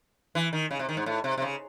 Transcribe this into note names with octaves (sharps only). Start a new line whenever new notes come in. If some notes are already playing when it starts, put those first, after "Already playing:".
E3
D#3
C#3
C3
D#3
G#2
A2
C3
C3
C#3